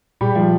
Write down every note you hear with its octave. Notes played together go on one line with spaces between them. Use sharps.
A#2 G3 G4
F3 G3 F4